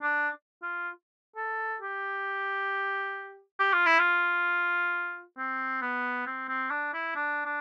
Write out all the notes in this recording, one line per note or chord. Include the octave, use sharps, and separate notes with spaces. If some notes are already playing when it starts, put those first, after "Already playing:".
D4
F4
A4
G4
G4
F4
E4
F4
C4
B3
C4
C4
D4
E4
D4
D4